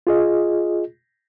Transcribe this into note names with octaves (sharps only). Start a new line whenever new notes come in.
F4 G#4 D#5